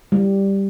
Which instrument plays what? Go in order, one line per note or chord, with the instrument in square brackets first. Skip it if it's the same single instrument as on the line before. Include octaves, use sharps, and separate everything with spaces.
[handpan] G3